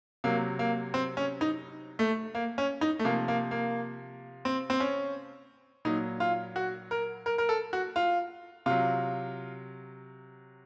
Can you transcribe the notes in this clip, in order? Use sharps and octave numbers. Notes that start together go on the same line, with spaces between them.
C3 F#3 A#3
A#3
C4
C#4
D#4
A3
A#3
C#4
D#4
A3
C3 F3 A#3
A#3
A#3
C4
C4
C#4
A#2 F#3 D#4
F4
F#4
A#4
A#4
A#4
A4
F#4
F4
C3 F#3 F4